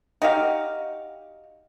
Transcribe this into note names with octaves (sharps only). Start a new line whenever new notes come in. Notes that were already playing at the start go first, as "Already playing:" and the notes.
D#4 F#4 G4 F5